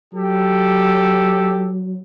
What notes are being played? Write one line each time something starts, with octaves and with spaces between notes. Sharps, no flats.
F#3 G4 A4